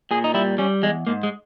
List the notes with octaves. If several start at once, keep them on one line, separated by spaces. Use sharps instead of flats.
A#2 G#4
D#4
G3 E4
G3 C#4
E2 G#3
G#2 A#3
G#3